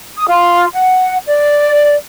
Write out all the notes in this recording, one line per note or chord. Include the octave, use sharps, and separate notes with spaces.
D#6
F4
F#5
D5